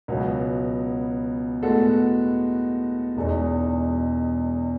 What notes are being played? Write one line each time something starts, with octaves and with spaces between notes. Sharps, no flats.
C#2 B2 F#3 B3
A2 G#3 B3 F#4 A4
E1 E2 B2 G#3 D#4